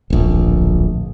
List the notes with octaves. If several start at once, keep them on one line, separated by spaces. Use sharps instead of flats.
D1 A#1